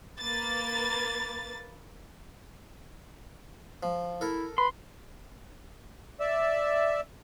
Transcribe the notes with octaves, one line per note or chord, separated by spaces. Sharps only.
A#3 B4 A6
F3
E4 A4 A#4
B4 B5 C6
D5 E5